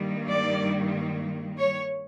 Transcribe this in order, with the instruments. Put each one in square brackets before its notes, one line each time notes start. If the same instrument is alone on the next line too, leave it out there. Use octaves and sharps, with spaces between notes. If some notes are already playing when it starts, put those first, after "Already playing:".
Already playing: [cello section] G2 D#3 G3 A#3
D5
C#5